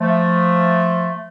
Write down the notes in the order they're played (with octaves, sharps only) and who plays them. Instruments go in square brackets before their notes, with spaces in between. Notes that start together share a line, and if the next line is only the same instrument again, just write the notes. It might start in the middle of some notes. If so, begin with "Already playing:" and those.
[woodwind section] F3 A3